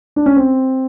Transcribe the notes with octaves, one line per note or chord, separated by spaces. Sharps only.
D4
C#4
C4